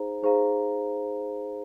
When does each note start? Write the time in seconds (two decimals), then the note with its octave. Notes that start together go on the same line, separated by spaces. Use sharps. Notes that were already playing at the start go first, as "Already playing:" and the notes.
Already playing: D#4 G#4 C5 F5 A#5
0.23 D#4 G#4 C5 F5 A#5